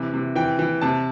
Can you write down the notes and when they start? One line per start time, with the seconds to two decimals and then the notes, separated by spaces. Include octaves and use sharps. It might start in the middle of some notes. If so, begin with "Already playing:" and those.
Already playing: C3 E3
0.14 C3
0.36 E3 G5
0.59 E3
0.82 C3 A5